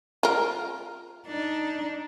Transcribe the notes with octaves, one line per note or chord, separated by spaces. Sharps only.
F4 A#4
D4 D#4